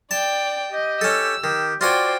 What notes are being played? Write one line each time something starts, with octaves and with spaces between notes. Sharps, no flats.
D5 G5 A5
G4 D#5
C#4 A4 E6
D#3 G4
F4 F#4 C5 D5 G5 G#5